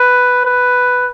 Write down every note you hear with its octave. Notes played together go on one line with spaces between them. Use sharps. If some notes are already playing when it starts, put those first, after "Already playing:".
Already playing: B4
B4